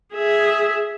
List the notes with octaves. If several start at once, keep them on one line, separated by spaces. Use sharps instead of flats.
G#4 E5